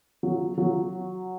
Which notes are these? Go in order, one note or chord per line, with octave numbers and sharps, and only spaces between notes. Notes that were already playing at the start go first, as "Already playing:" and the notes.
F#3
F#3